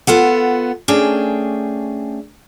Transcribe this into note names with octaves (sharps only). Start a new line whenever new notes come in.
B3 F4 A4 F#5
A3 C#4 D4 G#4 G5